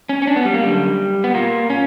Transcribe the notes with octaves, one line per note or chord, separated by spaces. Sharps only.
C#4
C#4
D4
B3
G3
A#3
F#2 D3 G3
B3
A#2 A#3
C#4